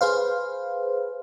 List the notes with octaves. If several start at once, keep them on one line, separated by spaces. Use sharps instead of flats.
G#4 B4 C5 F5